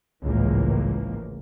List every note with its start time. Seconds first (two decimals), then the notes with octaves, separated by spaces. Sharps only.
0.23 G#1 C#2 A2 E3 F3 A#3